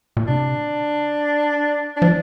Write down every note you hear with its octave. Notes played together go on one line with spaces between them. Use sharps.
A#2
C3 D4
D4
F3